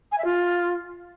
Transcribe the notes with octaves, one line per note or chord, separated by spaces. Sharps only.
G#5
E5
F4